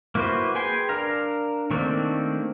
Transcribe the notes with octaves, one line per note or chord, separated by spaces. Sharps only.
A#3 E4 F#4 B4 C5
G#4 B4 G5 G#5 C6
D4 A#4 F5 A#5
D#3 A3 A#3 C4 D4